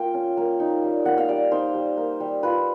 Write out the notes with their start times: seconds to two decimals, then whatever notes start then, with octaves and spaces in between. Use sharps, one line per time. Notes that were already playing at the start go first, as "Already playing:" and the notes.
Already playing: A#3 F4 G5
0.14 C#4
0.37 A#3
0.60 D#4
0.84 G3
1.05 A#3 F#5
1.18 F5
1.29 G3 D5
1.51 D#4 C5
1.74 G3
1.97 A#3
2.20 G3
2.43 F4 B4